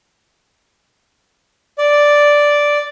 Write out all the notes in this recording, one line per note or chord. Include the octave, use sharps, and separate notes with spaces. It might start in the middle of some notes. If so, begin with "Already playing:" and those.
D5